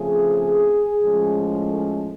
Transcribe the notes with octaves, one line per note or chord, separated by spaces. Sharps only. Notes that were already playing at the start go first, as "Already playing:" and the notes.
Already playing: C#3 F3 A3 C4 G#4
A2 F3 G#3 C#4
A4